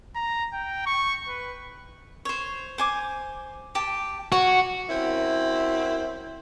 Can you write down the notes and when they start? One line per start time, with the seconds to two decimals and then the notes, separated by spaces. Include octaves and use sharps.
0.15 A#5
0.53 G5
0.86 C#6
1.28 B4
2.25 C5 C#5
2.78 C5 G#5 D6
3.75 G4 A5
4.32 F#4 C#5
4.89 F#2 C4 E4